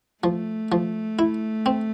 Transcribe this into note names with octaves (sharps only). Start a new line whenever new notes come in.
F3 A3
F3
E4
C4